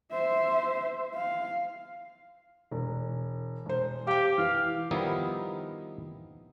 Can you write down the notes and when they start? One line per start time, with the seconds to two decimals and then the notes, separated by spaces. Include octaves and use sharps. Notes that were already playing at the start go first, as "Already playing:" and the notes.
0.11 C5 E5
1.15 F5
2.71 E1
3.66 E1 C5
4.07 G4 F5 G5
4.38 E3 F5
4.91 D#3 F3 G3 B3 D#4 E4